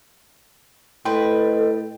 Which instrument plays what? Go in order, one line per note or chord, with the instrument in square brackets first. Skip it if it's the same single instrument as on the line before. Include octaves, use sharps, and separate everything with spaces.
[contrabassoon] A2 [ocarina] A4 [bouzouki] B4 C5 D#5 [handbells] G5